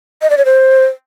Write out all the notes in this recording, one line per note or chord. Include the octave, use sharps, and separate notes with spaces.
D#5
D5
C#5
C5